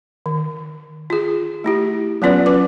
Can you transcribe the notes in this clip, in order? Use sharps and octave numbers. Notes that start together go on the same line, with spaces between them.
D#3
F4 G#4
A3 E4 G4
F#3 B3 C#4 F4 B4 D5
C#4 B4 D6